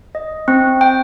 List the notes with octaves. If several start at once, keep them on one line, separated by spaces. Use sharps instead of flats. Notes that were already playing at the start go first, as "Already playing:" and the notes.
D#5
C4
G5